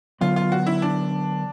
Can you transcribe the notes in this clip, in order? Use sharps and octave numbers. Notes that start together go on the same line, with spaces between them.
D3 F#3 B3 F4
F4
F#4
E4
D4